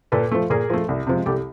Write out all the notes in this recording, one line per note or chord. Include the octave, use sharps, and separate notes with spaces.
A#2 A4 B4
F3 A3
A#2 G#4 A#4
F3 A3
C2
C3 F3 G#3
C2 G4 A4